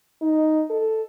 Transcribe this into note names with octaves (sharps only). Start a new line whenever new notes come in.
D#4
A4